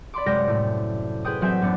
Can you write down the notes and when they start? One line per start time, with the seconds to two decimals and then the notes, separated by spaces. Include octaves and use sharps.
0.14 D5 B5 C6 D6
0.26 F#2 C3 G#3 A#4 G5 A#6
0.48 A2 A3
1.25 G#4 B4 C5 G5 D#6
1.41 A1 F#3 C4 E5 G#5 G6
1.62 F#2 A3 B3 D4